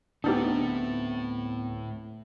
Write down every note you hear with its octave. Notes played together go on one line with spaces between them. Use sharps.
D2 A2 A3 B3 C4 D4 D#4 G4